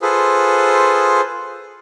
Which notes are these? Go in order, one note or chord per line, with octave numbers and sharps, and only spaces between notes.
F4 G#4 A4 B4 C5